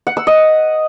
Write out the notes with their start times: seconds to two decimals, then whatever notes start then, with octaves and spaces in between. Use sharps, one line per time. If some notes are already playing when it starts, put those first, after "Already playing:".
0.07 F#5
0.17 E6
0.27 D#5